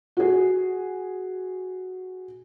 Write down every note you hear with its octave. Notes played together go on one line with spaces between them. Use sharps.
F#4 G#4